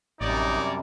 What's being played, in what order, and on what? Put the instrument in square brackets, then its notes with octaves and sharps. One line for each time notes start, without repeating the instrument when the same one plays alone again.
[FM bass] A1 [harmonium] F#2 C3 G3 [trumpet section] A#3 C#5 D5 [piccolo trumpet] D#4